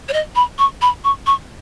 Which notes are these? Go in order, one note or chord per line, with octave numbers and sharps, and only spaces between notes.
C#5
D#5
B5
C#6
B5
C#6
C#6